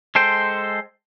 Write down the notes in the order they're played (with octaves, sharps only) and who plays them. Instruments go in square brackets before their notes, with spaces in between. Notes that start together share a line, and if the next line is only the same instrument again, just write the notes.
[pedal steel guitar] G#3 A4 C5 G5